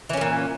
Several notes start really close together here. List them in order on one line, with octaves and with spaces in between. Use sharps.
E3 C#4 C#3 A#2